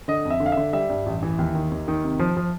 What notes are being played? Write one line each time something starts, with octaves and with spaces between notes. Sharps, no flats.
D3 D#5
F2
E5
D3
F5
E5
D3
G3 E5
G2
A1
E3
D#2
D#3
D#2
D#3
C3
F3
F3